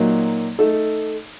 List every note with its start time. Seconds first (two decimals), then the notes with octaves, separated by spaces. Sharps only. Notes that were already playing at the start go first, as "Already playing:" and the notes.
Already playing: A#2 F#3 A#3 D#4
0.59 A3 D#4 A4